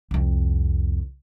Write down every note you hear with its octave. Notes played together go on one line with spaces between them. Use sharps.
C2 F2